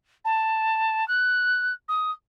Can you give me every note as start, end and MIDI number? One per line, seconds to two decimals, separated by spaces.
0.25 1.07 81
1.08 1.73 90
1.89 2.11 87